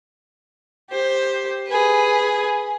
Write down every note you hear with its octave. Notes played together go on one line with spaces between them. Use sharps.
G4 C5
G#4 B4